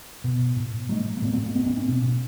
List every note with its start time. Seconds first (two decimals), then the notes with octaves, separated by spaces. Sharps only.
0.24 B2
0.56 A2
0.89 A2 G3 A3
1.17 A#3
1.22 A2 A3 B3
1.33 A#3 C4
1.44 A#3 C4
1.55 A2 B3 C#4
1.66 B3 C#4
1.77 C4 D4
1.89 B2